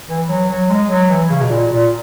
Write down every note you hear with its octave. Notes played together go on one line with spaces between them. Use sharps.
E3
F#3
F#3
G#3
F#3
E3
C#3
B2
A#2
A#2